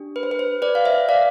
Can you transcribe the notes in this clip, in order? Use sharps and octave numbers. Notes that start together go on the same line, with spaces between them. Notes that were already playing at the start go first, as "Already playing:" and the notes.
Already playing: D4 G4
B4
C5
B4
C5
B4 D5
F5
C5 E5
D5 F5